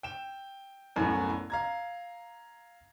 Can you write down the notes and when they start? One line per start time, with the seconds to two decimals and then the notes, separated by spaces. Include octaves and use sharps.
0.03 G5 E7
0.96 C2 F#2 A2 A3 B3
1.50 F5 A#5 G#6